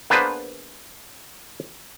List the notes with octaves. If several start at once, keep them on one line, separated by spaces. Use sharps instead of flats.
A#3 B3 D4 G#4 B4 C5